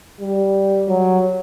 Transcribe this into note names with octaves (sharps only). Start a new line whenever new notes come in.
G3
F#3